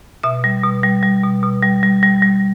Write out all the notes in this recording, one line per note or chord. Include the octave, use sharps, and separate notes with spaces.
B2 E5
G3
B2
G3
G3
B2
B2
G3
G3
G3
G3